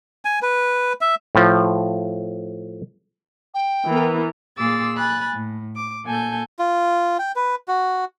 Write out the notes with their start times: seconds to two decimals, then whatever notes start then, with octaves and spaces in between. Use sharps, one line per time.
0.25 G#5
0.42 B4
1.01 E5
1.35 A2 F3
3.54 G5
3.88 E3 B3 A#4
4.57 A#2 G#4 C6 D6 E6 A6
4.96 G#5 B5 F#6 A6
5.31 A2
5.75 D6
6.05 A#2 A4 G#5 A5 G6
6.59 F4
7.19 G5
7.36 B4
7.68 F#4